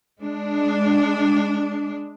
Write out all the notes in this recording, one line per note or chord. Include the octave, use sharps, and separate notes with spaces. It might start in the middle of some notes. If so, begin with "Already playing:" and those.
G#3 D4